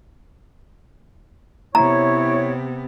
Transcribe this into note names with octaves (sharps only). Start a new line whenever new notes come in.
C3 B3 E4 C#5 A#5